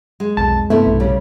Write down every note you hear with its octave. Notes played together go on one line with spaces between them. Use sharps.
G#3
B1 F2 A5
G2 C3 A3 B3 E4
B1
C#3 G3